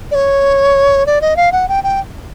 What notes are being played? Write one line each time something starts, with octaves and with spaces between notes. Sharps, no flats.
D5
C#5
D5
D#5
F5
F#5
G5
G5